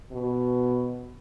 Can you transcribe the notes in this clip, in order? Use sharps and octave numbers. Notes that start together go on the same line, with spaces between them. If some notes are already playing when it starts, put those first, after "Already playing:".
B2